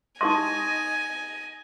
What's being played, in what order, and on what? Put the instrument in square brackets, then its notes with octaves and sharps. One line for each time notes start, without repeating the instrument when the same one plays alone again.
[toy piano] D#4 G4 C6 [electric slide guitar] D#5 [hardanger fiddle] G#5